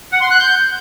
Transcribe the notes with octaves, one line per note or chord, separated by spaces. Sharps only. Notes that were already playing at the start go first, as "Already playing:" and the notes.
F#5
C6
F#6
G6